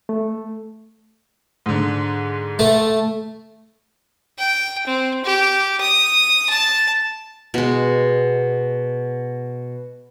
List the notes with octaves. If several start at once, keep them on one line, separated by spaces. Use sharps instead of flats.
A3
G#2 D3
A3
G5
C4
G4
D#6
A5
B2 G#3